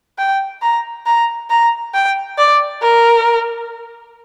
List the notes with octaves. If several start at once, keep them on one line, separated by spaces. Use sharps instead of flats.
G5
A#5
A#5
A#5
G5
D5
A#4